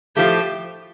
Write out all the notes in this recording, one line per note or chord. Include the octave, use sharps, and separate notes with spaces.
A2 F3 A3 G4